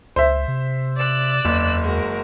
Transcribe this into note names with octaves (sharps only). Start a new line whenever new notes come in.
C#2 C5 E5
C3
D5 E6 F#6
F#1 E2
G#3 F#4 A#4